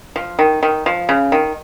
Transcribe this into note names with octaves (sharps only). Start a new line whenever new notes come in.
F3
D#3
D#3
F3
C#3
D#3